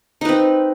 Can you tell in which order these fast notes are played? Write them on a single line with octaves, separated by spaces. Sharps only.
D#4 B4 C4